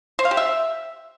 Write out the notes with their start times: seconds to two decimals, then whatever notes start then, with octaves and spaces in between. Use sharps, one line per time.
0.19 C5
0.25 F5
0.31 G4
0.37 E5